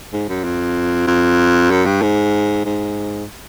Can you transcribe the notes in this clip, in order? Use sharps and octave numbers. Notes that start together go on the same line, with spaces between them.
G#2
F#2
F2
F2
F#2
G2
G#2
G#2